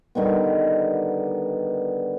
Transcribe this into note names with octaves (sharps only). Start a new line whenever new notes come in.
D3 D#3 G3 B3